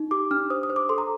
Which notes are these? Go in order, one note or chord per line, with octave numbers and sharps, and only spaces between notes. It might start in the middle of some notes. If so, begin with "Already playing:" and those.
Already playing: D#4
G4 D6
D4 F6
C5 D#6
D#6
C5
D6
A4 C6
A#5